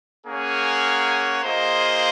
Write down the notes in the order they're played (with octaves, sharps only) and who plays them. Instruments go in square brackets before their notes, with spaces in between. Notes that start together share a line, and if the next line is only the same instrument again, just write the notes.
[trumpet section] A#3 C#4 G#4 C#5 F#5
A#3 F4 G#4 C5 D#5